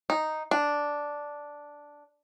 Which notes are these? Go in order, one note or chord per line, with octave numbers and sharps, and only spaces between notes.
D#4
D4